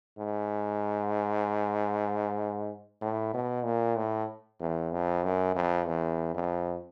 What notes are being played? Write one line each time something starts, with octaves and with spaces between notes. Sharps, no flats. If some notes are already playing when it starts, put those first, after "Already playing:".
G#2
A2
B2
A#2
A2
E2
F2
F#2
F2
E2
F2